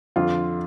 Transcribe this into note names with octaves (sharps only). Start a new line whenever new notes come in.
F2 D3 F4